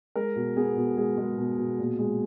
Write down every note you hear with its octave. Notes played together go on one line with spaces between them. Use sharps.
G#3 A#4
B2
B3 G#4
B2
G#3 G#4
G#3
B2
B2
A#2
G#3